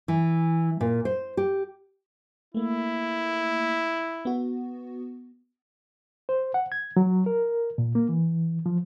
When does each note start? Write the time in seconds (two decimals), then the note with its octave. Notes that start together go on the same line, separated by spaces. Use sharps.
0.08 E3
0.81 A#2
1.05 C5
1.37 G4
2.54 A3 A#3 E4
4.25 B3 F#4
6.29 C5
6.54 F#5
6.72 G#6
6.97 F#3
7.26 A#4
7.78 A#2
7.95 A#3
8.09 E3
8.66 F3